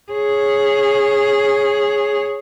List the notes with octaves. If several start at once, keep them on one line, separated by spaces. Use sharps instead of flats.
G#4 C#5